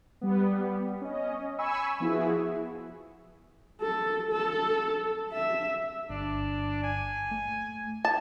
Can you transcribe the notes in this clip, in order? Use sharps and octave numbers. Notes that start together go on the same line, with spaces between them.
G3 B3
C#4 D#5
G#5 B5 C#6 E6
F3 B3 E4 F#4 G#4
A4
A4
E5
G1 D4
G#5
A3
A5